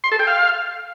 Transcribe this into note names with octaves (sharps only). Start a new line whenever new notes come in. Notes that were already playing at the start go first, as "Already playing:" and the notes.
C6
A4
G5
F5